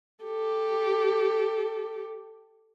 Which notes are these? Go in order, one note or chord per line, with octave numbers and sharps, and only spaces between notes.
G4 A4